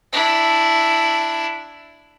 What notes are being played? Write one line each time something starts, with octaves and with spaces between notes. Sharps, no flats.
D4 E4